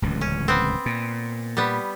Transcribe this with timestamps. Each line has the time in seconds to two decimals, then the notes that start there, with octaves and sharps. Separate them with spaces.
0.02 D1 C#2 E3
0.21 C#4
0.48 B3 C4
0.86 A#2
1.57 G3 B3